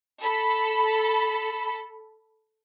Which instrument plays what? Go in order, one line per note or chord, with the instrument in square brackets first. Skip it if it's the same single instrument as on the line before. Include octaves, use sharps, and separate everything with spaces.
[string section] A4 B5